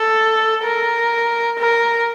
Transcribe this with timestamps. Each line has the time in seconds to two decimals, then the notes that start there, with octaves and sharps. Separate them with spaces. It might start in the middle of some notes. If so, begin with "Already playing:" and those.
Already playing: A4
0.64 A#4
1.59 A#4